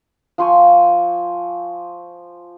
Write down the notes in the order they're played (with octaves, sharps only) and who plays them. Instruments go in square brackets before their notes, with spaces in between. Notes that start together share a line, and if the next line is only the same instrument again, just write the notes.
[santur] F3 C5 G#5 C#6